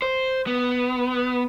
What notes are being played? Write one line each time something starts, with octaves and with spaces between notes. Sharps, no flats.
C5
B3